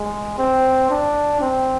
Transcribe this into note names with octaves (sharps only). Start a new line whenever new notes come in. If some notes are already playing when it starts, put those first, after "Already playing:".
Already playing: G#3
C4
D4
C4